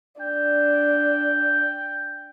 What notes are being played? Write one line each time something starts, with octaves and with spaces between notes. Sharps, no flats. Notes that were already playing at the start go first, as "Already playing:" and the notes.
D4 G5